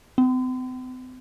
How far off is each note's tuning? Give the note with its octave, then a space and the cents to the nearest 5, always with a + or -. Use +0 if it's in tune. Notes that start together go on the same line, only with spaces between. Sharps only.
C4 -45